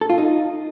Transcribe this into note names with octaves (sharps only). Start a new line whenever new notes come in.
A4
F4
D#4